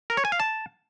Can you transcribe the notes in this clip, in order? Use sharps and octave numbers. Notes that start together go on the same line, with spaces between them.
A#4
C#5
G#5
F5
A5